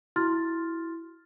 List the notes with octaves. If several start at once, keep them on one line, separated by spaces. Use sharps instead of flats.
E4 F#4 C6 F6 A6